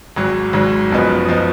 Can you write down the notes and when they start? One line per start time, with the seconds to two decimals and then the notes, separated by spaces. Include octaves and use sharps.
0.16 G#1 G#2 F#3
0.53 G#1 G#2 F#3
0.91 F#1 F#2 F3 B3 D#4
1.29 F3 B3 D#4